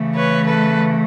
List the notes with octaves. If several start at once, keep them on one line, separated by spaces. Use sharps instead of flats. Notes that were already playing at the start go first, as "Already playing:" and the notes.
Already playing: C#3 E3 A3
B4 C#5
A4 B4